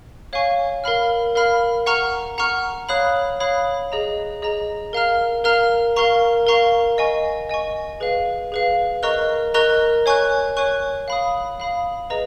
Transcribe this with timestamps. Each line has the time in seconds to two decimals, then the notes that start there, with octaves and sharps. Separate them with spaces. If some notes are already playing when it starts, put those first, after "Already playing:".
0.33 C#5 F5 G#5 C#6
0.84 A#4 F5 B5 F6
1.35 A#4 F5 B5 F6
1.86 F#5 A#5 C#6 F6
2.38 F#5 A#5 C#6 F6
2.89 C#5 F5 B5 D#6 F#6
3.40 C#5 F5 B5 D#6 F#6
3.92 G#4 D#5 A#5
4.42 G#4 D#5 A#5
4.93 A#4 F5 A#5 F6
5.44 A#4 F5 A#5 F6
5.96 A#4 F5 A#5 C#6
6.47 A#4 F5 A#5 C#6
6.98 D#5 G#5 C#6
7.49 D#5 G#5 C#6
8.00 G#4 B4 F5
8.52 G#4 B4 F5
9.03 A#4 D#5 A#5 C#6 F#6
9.54 A#4 D#5 A#5 C#6 F#6
10.06 C#5 G#5 C#6 F#6
10.57 C#5 G#5 C#6 F#6
11.08 F5 B5 D#6
11.60 F5 B5 D#6
12.10 G#4 B4 D#5 A#5